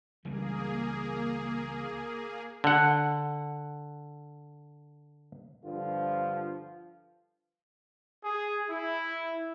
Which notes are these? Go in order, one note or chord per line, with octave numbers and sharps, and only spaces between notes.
C#2 E3 G3 A#3 G#4
D3 F#5
G2 D3 F3 F4
G#4
E4